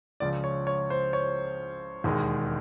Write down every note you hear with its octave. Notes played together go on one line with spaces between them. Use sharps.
C#2 C#3 F3 D5
C#5
C#5
C5
C#5
E1 D#2 D#3 G#3